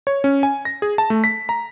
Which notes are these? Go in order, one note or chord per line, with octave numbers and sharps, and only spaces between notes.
C#5
C#4
G#5
A#6
G#4
A5
A3
B6
A#5